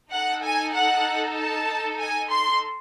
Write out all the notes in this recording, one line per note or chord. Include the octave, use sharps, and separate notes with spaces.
D#4 A4 F#5
G#5
F#5
A5
G#5
C6